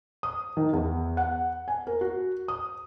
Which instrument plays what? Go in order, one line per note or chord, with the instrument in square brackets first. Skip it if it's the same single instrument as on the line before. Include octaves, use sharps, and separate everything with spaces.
[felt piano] D#6
D#3
E2
F#5
G#5
A#4
F#4
D#6